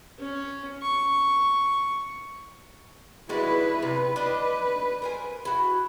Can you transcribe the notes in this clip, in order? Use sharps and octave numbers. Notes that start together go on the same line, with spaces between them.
C#4
C#6
G#3 D4 E4 F#4 B4
C3 B4
D4 D#5
A#4 C5 G#5
E4 F#4